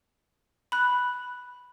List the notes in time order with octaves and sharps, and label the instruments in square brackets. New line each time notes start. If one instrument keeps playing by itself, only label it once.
[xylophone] B5 F#6